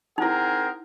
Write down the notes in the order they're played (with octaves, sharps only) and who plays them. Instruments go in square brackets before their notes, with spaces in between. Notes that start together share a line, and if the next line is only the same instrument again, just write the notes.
[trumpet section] C4 G#4 A#4 [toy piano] D#4 E4 [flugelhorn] F#5